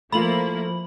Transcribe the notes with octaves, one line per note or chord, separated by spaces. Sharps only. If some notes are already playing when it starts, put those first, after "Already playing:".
F3 A3 A#3 E4 F4 B5 F#7